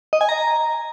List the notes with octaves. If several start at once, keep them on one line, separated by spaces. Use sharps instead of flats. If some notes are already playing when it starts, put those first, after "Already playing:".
D#5
G#5
A#5